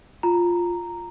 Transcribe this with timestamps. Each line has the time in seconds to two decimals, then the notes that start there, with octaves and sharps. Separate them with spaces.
0.23 F4 A#5